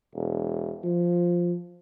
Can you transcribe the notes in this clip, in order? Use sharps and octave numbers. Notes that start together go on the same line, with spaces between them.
E1
F3